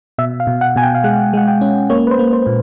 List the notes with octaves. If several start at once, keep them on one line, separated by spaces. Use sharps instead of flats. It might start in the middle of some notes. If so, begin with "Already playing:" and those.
B2 E5
F5
B2
F#5
B2 G#5
G5
F5
G#3 F#5
G#3 F#5
G5
C#4
A#3 C#5
B4
C5
A#3
C5
A#2